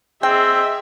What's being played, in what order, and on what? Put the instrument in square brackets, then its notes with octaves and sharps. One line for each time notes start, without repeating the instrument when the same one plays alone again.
[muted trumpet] C4 [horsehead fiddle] G#4 D#5 [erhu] E5 [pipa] G5